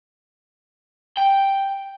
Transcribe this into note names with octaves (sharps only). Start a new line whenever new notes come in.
G5